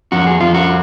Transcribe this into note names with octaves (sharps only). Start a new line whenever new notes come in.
F2 F#4
G#4
F2 F4
F#4